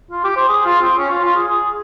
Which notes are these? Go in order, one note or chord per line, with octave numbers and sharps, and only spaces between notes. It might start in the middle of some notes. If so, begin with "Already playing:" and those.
F4
G4
C5
G#4
F4
C4
C#4
F4
F4
G#4
G#4